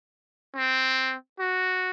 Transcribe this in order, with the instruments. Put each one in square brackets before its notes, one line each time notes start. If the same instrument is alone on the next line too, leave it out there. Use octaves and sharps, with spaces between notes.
[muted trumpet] C4
F#4